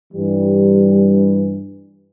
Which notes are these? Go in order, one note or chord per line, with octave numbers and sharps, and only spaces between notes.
G2 E3 G3